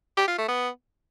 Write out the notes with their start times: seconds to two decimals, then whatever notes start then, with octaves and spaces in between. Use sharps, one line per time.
0.17 G4
0.28 F4
0.38 A3
0.48 B3